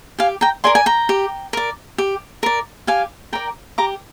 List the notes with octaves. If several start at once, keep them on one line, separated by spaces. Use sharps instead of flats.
G4 F5 G#5
G5 A#5
A#4 D5 G#5 C6
G#5
G5 A#5
G4
A#4 D5
G4
A#4 D5
G4 F5 G#5
A#4 D5 G5 A#5
G4 A#5 D6